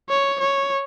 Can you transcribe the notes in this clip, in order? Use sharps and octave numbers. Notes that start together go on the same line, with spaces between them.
C#5
C#5